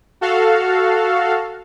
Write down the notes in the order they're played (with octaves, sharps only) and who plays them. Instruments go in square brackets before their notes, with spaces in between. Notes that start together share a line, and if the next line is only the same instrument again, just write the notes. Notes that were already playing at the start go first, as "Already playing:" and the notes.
[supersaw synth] F#4 A4 F5